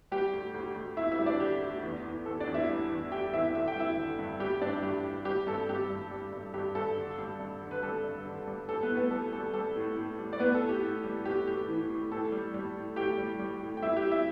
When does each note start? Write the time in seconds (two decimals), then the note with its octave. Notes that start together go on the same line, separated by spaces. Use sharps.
0.12 G3 G4 G5
0.33 D2
0.54 D2
0.76 D2
0.97 D2 E4 E5
1.12 E4 E5
1.19 G3
1.26 D4 D5
1.40 D3 G4
1.62 D2
1.83 E2
2.04 E2
2.26 E2 A4
2.40 D4 D5
2.47 E2
2.54 E4 E5
2.69 G3
2.90 E2
3.11 G3 G4 G5
3.33 E2 E4 E5
3.54 D3 E5
3.68 G5
3.76 G3 E4 E5
3.97 D3
4.19 G2
4.40 G3 G4 G5
4.61 G2 D4 D5
4.83 G2 G4
5.04 G3
5.25 G3 G4
5.47 G2 A4
5.69 G2 G4
5.90 G2
6.11 G3
6.32 G2
6.54 G2 G4
6.75 G2 A4
6.97 D3
7.18 G3
7.40 G2
7.61 D3
7.71 B4
7.83 G3 A4
8.04 G2
8.25 D3
8.47 G3
8.68 G3 A4
8.83 B3 B4
8.90 A2
8.97 B3 B4
9.11 G3 A4
9.33 G3 A4
9.54 G3 A4
9.76 A2
9.97 A2
10.19 G3
10.33 D5
10.40 A2 B3 B4
10.54 A4
10.61 A2
10.69 G4
10.83 A2
11.04 G3
11.25 A2 G4
11.47 A2 G4
11.68 E3
11.90 A2
12.11 A2 A4
12.32 G3
12.54 G3
12.75 A2
12.96 A2 G4 G5
13.18 G3
13.40 G3
13.62 A2
13.77 G5
13.82 G3 E4 E5
13.97 G4 G5
14.04 G3
14.11 E4 E5